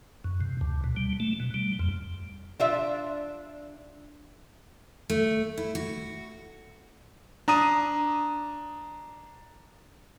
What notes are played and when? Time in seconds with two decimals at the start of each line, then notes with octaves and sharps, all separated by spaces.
0.24 F#2
0.41 C3
0.61 D2
0.84 B2
0.97 G3
1.20 A3
1.40 B2
1.54 G3
1.79 F2
2.60 D4 F4 E5
5.10 A3
5.58 E4
5.75 F#4
7.48 D4 A#5 D#6 D#7